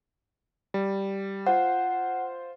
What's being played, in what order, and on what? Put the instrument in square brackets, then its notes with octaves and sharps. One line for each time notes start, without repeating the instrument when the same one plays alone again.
[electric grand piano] G3
[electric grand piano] F4 C5 [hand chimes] F#5